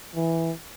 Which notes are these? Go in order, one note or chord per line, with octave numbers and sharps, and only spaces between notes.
E3